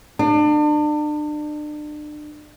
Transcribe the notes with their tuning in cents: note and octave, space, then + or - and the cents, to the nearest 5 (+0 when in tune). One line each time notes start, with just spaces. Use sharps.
D4 +35